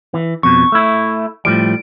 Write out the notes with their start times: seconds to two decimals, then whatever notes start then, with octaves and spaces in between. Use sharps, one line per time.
0.14 E3
0.43 F2 B2 C#6
0.72 A3 E4
1.45 A2 F3 G3 D7